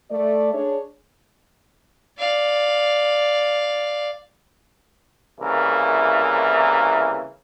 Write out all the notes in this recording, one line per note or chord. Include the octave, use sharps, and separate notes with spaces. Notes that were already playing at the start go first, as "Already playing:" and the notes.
A3 D5
D4 G#4 C#5
D5 F5
C2 C#3 E3 A#3 A#4